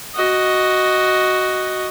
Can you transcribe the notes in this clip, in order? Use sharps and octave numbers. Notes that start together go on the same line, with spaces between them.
F#4 D#5